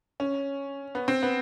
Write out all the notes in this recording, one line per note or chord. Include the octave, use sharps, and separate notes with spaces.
C#4
B3
C4
B3